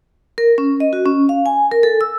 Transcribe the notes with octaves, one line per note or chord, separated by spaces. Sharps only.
A#4
C#4
D#5
F#4
C#4
F5
G#5
A#4
A4
E6